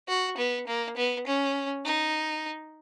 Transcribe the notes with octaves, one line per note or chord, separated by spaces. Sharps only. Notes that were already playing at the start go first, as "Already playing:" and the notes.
F#4
B3
A#3
B3
C#4
D#4